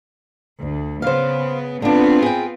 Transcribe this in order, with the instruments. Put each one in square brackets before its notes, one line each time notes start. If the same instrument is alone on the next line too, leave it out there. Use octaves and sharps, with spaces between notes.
[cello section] D2
[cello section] C#3 B3 [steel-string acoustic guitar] C5 F5
[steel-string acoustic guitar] D3 D4 [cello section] B3 C4 F4
[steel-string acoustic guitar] G#4 G5